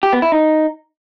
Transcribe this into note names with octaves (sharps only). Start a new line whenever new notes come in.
G4
B3
E4
D#4